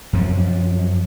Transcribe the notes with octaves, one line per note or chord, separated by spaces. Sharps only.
F#2 F3 F#3